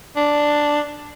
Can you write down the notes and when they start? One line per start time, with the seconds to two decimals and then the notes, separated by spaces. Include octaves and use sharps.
0.16 D4